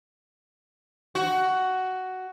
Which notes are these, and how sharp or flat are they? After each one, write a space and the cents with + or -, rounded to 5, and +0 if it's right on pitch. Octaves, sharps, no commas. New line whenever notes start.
F#4 +10